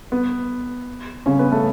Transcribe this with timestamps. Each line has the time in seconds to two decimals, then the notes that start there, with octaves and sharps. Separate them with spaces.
0.12 B3
1.26 C#3 C#4
1.39 B3 B4
1.52 A3 A4